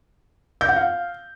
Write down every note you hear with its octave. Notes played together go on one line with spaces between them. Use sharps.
G6
F#5
F5